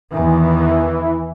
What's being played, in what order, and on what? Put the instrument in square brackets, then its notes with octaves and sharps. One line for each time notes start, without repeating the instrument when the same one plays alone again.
[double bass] E2 D#3 [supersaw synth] E3